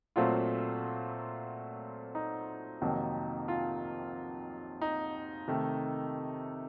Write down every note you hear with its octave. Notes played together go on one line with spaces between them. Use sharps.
A#2 F#3 A3 C4 F4
D#4
F2 C3 D#3 F#3 A#3
F4
D#4
C3 D#3 A3